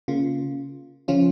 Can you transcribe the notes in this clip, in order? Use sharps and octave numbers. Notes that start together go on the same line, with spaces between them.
C#3 A#3 F4
C#3 F3 C#4 F4